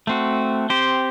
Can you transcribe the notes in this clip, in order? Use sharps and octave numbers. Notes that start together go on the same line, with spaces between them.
A3 C4 F#4
C4 G4 C5